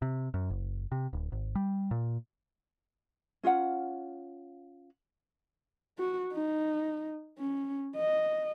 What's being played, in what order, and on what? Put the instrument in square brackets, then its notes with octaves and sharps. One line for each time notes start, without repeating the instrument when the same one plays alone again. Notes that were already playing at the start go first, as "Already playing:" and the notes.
[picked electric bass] C3
F#2
F#1
C3
D1
G#1
G3
A#2
[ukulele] C#4 F4 F5 F#5
[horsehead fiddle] F#4
D#4
C#4
D#5